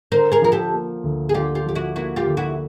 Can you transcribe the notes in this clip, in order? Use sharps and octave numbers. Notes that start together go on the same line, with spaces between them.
D3 A#4 C5
G#4 A#4
F3 A#4
G4 A4
A#3
D2
G#4
D3 F4 G4
F4 G4
F3 G4
E4 F#4
A#3 E4 F#4
F4 G4
D2
E4 F#4